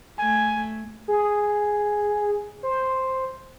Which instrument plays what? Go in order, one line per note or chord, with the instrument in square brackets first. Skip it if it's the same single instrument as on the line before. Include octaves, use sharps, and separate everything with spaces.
[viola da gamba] A3 [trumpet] G#5
[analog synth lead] G#4
C5